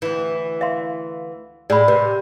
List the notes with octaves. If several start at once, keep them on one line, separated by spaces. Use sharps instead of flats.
D2 E3
E5 F5 C6
A2 G#4 D5 B5
C3 B4